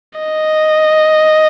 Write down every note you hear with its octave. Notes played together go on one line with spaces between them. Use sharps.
D#5